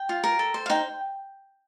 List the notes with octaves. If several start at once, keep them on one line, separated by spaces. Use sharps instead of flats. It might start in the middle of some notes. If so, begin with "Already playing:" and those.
Already playing: G5
F4
A#4
A4
C5
F5
D#4 G5